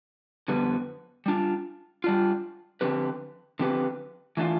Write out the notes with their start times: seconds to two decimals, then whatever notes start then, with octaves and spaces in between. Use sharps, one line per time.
0.48 F2 D3 G3 B3
1.26 G3 D4 F4
2.04 G3 D4 F4
2.81 D3 F3 C4 G4 B4
3.59 D3 F3 C4 G4 B4
4.37 E3 A3 D4 F4